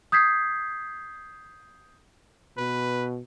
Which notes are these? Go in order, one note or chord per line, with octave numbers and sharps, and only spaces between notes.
D#6 G6 G#6 B6 C7
B2 B4